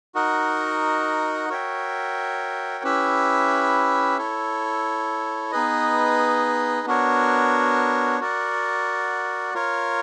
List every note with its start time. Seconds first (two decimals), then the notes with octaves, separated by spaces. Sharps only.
0.15 D#4 F#4 A#4 D#5 F#5
1.49 F#4 A#4 C#5 E5 G5
2.84 C#4 E4 G4 B4 E5
4.18 E4 A4 C#5
5.52 B3 D#4 G#4 B4 D#5
6.85 B3 D4 F#4 A#4 C#5
8.20 F#4 A#4 D5 F#5
9.54 F4 A#4 C#5